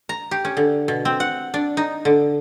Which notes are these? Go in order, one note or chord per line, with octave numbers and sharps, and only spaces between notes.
A#5
G4
C#4
D3
B2
C4
F#5
D4
D#4
D3